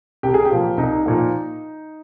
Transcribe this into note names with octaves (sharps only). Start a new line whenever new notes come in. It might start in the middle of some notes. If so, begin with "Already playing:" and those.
C2 G4
G#4
G4
A#2 F3 A#3
C2 D#4
A#2 F3 A#3